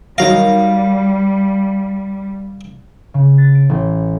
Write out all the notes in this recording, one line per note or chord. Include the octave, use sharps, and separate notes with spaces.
D#3 F#3 G3 F5 A#6
C#3
A6
D7
A1